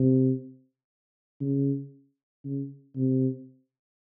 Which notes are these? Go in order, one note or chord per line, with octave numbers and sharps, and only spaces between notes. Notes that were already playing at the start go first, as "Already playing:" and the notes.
Already playing: C3
C#3
C#3
C3